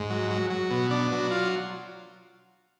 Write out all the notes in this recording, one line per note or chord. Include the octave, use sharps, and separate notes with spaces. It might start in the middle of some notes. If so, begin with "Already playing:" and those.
Already playing: G#2
F#3
F#3
F#3
B2
D4
F#3
F4